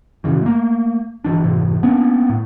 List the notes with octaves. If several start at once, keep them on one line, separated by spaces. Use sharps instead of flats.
F#2 A#2 C#3 E3
A3 A#3
G1 E3 D4
F1 G#2 C3 E3
A#3 B3 C#4 D4
A2